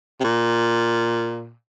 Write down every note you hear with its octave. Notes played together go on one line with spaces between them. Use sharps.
C3
A#2